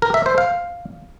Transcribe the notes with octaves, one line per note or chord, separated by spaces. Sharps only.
A#4
E5
C5
F5